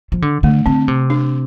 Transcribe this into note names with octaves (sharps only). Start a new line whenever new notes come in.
F3
D3
D3 A3
D3 C4
C3
D4